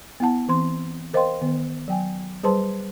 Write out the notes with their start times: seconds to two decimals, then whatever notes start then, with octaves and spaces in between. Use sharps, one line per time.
0.20 B3 E4 F#5 A5
0.49 E3 C4 C6
1.14 A#4 C5 D#5 F5 G5 C6
1.42 D#3 B3
1.88 F#3 G5 G#5
2.44 G3 G#4 B4 C5 A5 C6